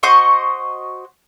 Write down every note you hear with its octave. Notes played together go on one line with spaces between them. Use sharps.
F#4 C5 D#5 C#6